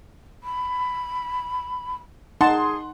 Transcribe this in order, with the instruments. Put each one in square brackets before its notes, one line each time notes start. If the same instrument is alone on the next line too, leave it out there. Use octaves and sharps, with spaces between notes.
[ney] B5
[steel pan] D#4 A5 [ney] G#4 [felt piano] F#5 [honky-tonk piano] C6